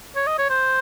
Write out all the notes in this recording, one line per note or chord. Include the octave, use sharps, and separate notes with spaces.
C#5
D#5
C#5
C5